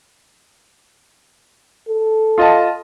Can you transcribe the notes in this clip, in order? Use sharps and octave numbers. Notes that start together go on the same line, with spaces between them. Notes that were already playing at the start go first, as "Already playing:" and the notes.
A4
F4 D#5 A5